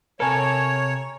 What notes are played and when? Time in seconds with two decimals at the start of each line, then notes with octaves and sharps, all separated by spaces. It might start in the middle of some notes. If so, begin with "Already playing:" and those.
0.20 C3 A4 A#4 C#5 G#5